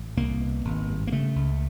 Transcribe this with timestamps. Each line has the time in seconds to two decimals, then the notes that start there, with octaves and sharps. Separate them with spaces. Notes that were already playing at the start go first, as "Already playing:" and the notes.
Already playing: A1
0.17 C2 A#3
0.40 B2
0.65 G#1
0.89 G2
1.07 A#3
1.12 C#3 A3
1.36 C#2